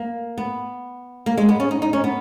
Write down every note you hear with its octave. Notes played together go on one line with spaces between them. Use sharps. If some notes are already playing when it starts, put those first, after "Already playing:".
Already playing: A#3
B3
A#3
G#3
B3
C#4
D#4
D#4
C#4
B3